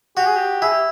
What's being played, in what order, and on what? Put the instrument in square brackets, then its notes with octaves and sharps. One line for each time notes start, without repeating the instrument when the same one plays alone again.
[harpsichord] F#4 [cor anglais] G4
[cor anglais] G#4
G4
[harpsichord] E4 [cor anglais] G#4
[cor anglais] G4